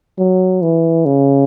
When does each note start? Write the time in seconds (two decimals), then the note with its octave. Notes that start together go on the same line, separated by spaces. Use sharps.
0.18 F#3
0.62 E3
1.05 C#3